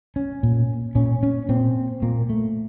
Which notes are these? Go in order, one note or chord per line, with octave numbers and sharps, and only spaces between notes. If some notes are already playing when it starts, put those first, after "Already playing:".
C#4
A#2
A#2 C#4
C#4
A#2 C4
A#2 A#3
A3